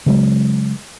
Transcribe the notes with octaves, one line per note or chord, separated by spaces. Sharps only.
C#3 F#3 G#3